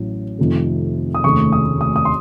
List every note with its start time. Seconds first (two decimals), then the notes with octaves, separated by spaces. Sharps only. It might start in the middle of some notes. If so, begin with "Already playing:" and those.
Already playing: A1 A2 F#3
0.38 F2 C3 D#3 A3
1.14 D#6
1.24 F1 D#2 C#3 A3 C#6
1.52 D#6
1.81 D#6
1.96 D#6
2.05 C6